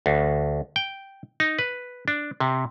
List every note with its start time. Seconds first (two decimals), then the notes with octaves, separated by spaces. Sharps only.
0.06 D2
0.76 G5
1.40 D#4
1.59 B4
2.08 D4
2.40 C3